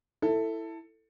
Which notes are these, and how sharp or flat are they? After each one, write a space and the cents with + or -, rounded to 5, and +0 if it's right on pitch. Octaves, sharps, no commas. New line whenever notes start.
E4 +0 A4 +15